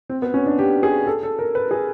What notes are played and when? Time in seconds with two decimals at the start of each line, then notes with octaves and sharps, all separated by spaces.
0.10 C4
0.22 B3
0.34 C#4
0.46 D4
0.59 G4
0.83 G#4
1.07 A4
1.23 A4
1.39 A#4
1.55 B4
1.71 G#4